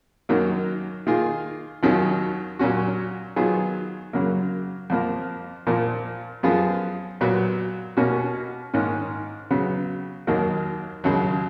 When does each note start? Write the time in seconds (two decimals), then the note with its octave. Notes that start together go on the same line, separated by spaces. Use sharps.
0.29 F#2 D#3 F#3 A#3
1.07 D#3 A#3 F4 G#4
1.83 D#2 D#3 F#3 C#4 F4
2.59 A#2 F#3 C#4 F#4
3.36 D#3 F#3 B3 F4 G#4
4.13 F#2 C#3 F#3 A#3
4.90 F2 F3 A#3
5.67 A#2 F3 A#3
6.43 F#2 F3 B3 F4 G#4
7.21 A#2 F#3 B3 F#4
7.97 B2 A#3 C#4 F#4
8.74 G#2 D#3 A#3 C#4
9.51 C#3 F#3 B3
10.27 D#2 D#3 F#3 A#3
11.04 D#2 C#3 F#3